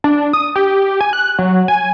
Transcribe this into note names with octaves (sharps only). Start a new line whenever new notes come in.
D4
D#6
G4
G#5
F#6
F#3
G#5